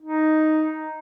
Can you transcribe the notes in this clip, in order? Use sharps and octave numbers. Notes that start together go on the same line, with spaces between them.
D#4